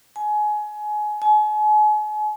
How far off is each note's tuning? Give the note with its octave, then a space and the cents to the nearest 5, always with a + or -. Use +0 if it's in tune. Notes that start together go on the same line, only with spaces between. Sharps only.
G#5 +25
G#5 +40